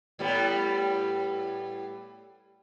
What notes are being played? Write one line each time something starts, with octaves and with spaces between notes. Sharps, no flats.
A2 G3 B3